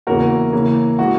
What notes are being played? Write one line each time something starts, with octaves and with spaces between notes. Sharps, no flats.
E2 C#3 E3 A#3 C#4 F#4 A#4
C#3 E3 A#3
E3 G#3 F#4